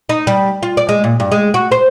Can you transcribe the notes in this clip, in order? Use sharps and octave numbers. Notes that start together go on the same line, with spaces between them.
D#4
G3
F4
D5
G#3
A#2
G2
G#3
F#4
C5